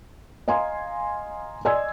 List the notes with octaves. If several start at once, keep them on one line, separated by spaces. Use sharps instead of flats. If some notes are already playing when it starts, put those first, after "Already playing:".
D#5 F5 G#5 A#5 C6
D5 D#5 G#5 C6 E6 G#6